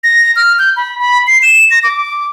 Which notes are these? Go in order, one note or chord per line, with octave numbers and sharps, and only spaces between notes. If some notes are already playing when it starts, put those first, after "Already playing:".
A#6
F6
G6
B5
B5
C7
E7
A#6
D6